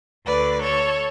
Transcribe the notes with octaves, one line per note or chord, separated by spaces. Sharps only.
D2 D3 B4 D5
A4 C#5